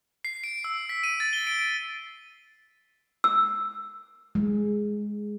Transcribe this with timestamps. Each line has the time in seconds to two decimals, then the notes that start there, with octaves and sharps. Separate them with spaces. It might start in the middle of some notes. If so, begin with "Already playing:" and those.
0.25 C7
0.44 D7
0.64 E6
0.89 B6
1.03 D#7
1.20 A6
1.33 G7
1.47 D7
3.24 E6
4.35 G#3